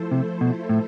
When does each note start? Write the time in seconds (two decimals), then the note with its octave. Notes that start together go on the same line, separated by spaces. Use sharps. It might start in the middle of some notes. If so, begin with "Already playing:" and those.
Already playing: F3 A3 E4 A4 C5
0.11 C3
0.41 B2
0.69 A2